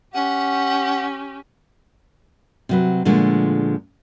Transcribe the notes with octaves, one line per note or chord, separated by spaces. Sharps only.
C#4 G4 F#5
C3 F#3 B4
A#2 D3 F3 G#3 A3